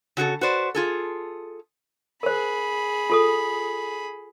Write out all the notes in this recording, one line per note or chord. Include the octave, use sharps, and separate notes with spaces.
C#3 F#4 G#4 A4
F#4 B4 C5 D5
F4 G#4 A4
G#4 A#4 C5 B5
F4 A4 D#6